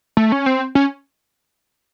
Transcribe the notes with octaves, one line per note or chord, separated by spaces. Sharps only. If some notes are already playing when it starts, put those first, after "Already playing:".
A3
C#4
C4
C#4